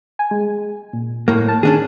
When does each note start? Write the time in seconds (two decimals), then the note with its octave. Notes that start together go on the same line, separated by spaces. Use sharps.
0.19 G#5
0.31 G#3
0.93 A#2
1.28 A2 A#3
1.48 A5
1.63 D#3 C#4 D4 G#4